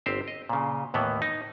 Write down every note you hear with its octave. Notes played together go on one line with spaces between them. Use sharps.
G1 C4 G4 C5
D#5
A#2 C#3
D#2 A2 E3 B3
D#4